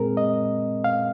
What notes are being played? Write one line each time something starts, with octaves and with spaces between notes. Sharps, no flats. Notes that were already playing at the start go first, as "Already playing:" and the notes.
Already playing: A#2 G#3 C4 G#4 A#4
D#5
F5